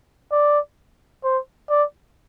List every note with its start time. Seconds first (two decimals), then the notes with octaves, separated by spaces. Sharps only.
0.32 D5
1.24 C5
1.70 D5